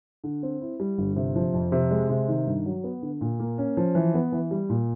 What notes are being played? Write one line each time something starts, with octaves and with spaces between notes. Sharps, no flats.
D3
C4
E4
G3
G1
C3
F3
F2
C3
G#3
C3
D#3
G2
F#3
B3
D3
A#2
A#3
C#4
F3
E3
B3
E3
G3
A#2